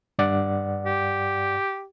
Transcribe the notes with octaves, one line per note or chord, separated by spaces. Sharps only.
G2 D5 F#5
G4